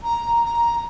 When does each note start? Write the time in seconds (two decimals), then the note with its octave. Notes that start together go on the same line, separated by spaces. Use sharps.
0.03 A#5
0.43 A#5